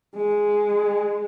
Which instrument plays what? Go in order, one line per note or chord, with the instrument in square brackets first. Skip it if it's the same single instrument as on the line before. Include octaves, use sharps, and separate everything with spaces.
[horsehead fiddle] G#3